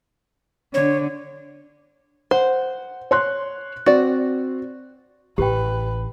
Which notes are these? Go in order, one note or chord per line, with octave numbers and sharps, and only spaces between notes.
D3 C#5
C5 F#5
C#5 C6 F#6
C4 F#4 D5
A1 G4 B4 G5